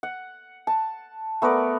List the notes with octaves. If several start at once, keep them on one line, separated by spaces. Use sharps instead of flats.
F#5
A5
A3 B3 A#4 D5